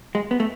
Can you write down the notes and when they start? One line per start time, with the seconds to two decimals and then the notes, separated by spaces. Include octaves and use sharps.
0.15 G#3
0.31 B3
0.40 A3